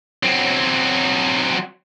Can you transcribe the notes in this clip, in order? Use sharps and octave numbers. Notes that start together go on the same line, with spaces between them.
F#3 C4